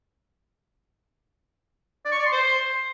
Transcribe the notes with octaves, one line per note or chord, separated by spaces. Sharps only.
D5
C#6
D5
C6
C5